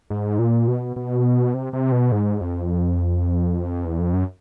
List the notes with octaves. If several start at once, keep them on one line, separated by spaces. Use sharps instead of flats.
G#2
A#2
B2
B2
C3
C3
B2
G#2
F2
E2
F2
F#2